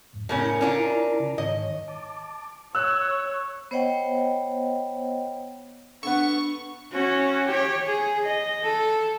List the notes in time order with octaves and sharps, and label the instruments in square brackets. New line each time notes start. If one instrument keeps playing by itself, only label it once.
[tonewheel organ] F2 G#2
[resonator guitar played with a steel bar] A2 C#3 C#4 [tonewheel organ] E4 A#4 A#5
[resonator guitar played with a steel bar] C#4 D4 F4
[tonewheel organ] C#3
[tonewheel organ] G#2 D#3 C#5 [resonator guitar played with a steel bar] D#5
[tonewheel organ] A5 D6
[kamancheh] C#5 [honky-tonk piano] E6 F#6
[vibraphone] B3 C5 C#5 D#5 F#5 G5
[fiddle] B3 [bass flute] D4 [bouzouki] A4 F#5 [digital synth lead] C#6
[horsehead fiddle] C#4 F#4
G4 C#5
G#4
D#5
A4